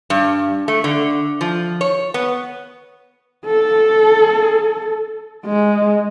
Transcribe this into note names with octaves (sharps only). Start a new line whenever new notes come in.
G2
A3
D3
F3
C#5
B3
A4
G#3